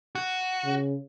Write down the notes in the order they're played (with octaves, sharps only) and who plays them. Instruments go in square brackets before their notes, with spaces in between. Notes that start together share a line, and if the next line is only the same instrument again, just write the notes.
[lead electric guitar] F#4
[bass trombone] C#3